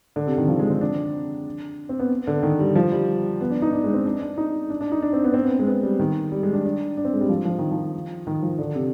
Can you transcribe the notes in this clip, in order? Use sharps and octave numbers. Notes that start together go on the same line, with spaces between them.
D3
C3
D#3
F3
G#3
C4
D4
C4
B3
D3
D#3
G3
F3
G3
B3
D4
D#4
D4
G#3
C4
D4
D4
D#4
D4
D4
D#4
D4
C4
B3
C4
B3
G#3
B3
G3
D#3
G3
G#3
D4
D4
D4
C4
G#3
G3
F3
F3
D#3
F3
D#3
F3
D3
C3